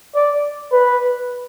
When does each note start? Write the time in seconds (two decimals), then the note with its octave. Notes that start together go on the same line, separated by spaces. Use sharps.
0.15 D5
0.72 B4